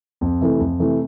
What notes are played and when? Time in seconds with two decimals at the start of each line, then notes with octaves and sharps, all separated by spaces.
0.21 F2
0.41 C3 E3 A3
0.60 F2
0.79 C3 E3 A3